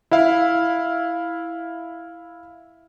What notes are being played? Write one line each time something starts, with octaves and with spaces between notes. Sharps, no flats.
E4 E5 F5